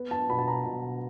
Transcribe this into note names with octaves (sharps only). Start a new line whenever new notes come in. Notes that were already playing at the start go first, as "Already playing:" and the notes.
Already playing: B3
A5
B2 B5
A5
A#5
B2